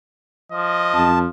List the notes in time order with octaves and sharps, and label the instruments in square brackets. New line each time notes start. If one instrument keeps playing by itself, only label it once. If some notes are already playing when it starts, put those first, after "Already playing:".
[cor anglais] F3 [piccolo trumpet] D#5
[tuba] F2 [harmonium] A5